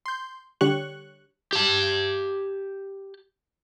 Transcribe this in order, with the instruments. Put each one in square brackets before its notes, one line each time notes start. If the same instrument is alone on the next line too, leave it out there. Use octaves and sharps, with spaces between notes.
[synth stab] C6 G6
D3 G3 G4 C#5 C#6 F#6
[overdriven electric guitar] G4 A5